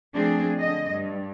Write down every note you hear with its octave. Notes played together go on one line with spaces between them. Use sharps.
F3 A3 C4 D4 G#4
D3 D#5
G2